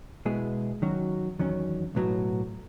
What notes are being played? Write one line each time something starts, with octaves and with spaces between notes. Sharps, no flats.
B2 G#3 B3 E4 G#4
D#3 F#3 C#4 F#4
E2 D#3 F#3 C#4
B1 A2 F#3 B3 F#4